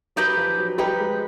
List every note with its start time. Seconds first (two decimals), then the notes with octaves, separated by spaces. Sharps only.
0.16 F#3 D#4 G4 B4
0.37 F3
0.58 F#3
0.78 G3 D#4 G4 B4
1.00 G#3